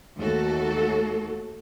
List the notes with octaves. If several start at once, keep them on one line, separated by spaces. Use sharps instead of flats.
D#2 A3 F#4 A4